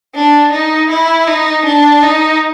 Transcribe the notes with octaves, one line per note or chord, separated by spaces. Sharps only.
D4
D#4
E4
D#4
D4
D#4